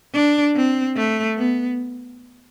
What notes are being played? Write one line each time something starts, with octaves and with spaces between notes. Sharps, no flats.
D4
C4
A3
B3